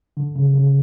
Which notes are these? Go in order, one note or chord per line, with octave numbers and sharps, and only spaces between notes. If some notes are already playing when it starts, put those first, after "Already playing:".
D3
C#3
C#3